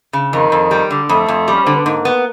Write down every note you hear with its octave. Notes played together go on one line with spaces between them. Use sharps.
C#3
F2 D#3
F2
G3
D3
F2 A3
F2
G3
C#4
D3 C4
B3
G#2 A#3
B3